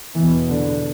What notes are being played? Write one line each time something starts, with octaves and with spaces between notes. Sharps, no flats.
E2 B2 E3
D3